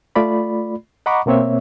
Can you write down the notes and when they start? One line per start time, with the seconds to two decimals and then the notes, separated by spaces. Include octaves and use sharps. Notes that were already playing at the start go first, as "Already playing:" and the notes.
0.16 A3 F4 D5 B5
1.06 D#5 F#5 A#5 B5 C#6 D6
1.26 B2 A#3 C4 C#5 E5